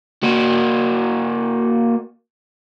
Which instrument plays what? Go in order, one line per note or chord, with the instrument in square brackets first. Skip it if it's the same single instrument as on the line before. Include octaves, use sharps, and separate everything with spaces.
[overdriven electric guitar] A#3 F#4